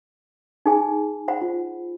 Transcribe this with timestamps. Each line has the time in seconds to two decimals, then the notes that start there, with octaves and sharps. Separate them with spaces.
0.66 D#4 G#4 G#5
1.28 C5 F#5 B5
1.42 F4